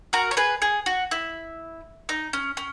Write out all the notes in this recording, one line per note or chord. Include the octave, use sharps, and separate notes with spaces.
F#4 A#4
C#5
G#4 B4
G#4
F#4
E4
D#4
C#4
C#4